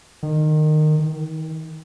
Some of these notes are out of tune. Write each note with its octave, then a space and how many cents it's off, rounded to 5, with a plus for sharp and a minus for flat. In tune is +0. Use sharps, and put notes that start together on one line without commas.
D#3 -20
D#3 +35